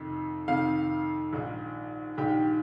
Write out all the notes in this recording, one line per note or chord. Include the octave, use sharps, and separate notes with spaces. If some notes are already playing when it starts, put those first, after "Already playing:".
Already playing: F2 C3 D#3
F2 C3 D#3 F5
A#1 G#2 D#3
A#1 G#2 D#3 G4